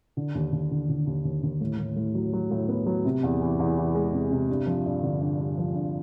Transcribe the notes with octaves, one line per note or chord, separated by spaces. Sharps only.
D3
D#2
D#2
D3
D3
D#2
D#2
D#2
A2
A2
A2
F#3
F#3
A2
B3
F#3
C3
E2
E3
E2
E3
G#3
C3
C3
G2
F3
G2
D3
G2
G2
F3
G2